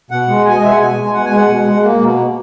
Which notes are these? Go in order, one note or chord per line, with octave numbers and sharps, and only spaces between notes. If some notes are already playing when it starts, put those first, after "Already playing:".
B2 F#5
G#3
B2 G#5
D#5
G#3 E5
F#5
B2 G#5
G#3
B2 F#5
G#5
G#3
F#5
B2
G#3
A#3
B2